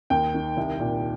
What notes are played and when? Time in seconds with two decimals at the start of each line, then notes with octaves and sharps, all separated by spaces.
0.10 D#2 G5
0.34 D#3
0.57 C2
0.80 A#2